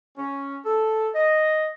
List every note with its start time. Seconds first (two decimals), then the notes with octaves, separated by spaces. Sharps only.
0.18 C#4
0.65 A4
1.15 D#5